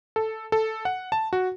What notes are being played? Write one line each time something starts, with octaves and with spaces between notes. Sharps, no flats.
A4
A4
F#5
A5
F#4